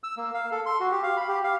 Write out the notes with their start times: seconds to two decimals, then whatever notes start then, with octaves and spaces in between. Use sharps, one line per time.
0.04 E6
0.17 A#3
0.34 F5
0.51 A4
0.66 C6
0.80 F#4
0.91 G4
1.03 F5
1.17 B5
1.28 G4
1.44 F5